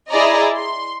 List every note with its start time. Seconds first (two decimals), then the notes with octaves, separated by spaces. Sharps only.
0.11 E4 G#4 D5 D#5 A#5
0.56 C6